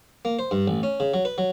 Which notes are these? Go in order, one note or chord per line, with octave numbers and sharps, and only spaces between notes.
A#3
C5
G2
A1
C#4
C#3
F#3
B4
F#3